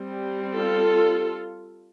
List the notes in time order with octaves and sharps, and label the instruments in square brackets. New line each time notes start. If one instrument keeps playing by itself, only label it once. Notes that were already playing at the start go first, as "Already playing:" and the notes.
Already playing: [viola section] G3 C4
F4 A4